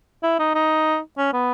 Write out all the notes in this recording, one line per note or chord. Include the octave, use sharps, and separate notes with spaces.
E4
D#4
D#4
C#4
B3